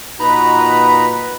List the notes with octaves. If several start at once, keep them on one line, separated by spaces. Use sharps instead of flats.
A#2 D#4 F4 F#4 B4 D#5 A#5 B5